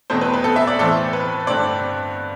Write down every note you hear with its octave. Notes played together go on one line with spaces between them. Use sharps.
E2 B2 A3 C4 C5
B4
B4
A4
E5
D5
A2 E3 A3 C4 A4
B4
G2 D3 A3 C4 D5